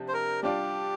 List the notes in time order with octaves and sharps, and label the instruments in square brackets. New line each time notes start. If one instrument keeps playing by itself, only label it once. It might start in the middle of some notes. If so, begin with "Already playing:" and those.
Already playing: [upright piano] C3 F3 D4 G4
[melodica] C5
A#4
[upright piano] G3 D4 F4 D5 [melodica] G4